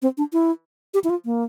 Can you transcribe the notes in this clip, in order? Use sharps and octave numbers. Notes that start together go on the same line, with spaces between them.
C4
D4
E4
G4
E4
F4
A#3